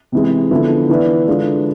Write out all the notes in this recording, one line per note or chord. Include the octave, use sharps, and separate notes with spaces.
C3 E3 G#3
D3 F3 B3 E4
E3 B3 E4 B4 D5
D3 G#3 D4 F4 B4